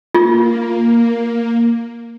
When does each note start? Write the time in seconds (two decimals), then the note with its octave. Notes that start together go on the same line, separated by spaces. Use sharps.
0.15 A#3 F4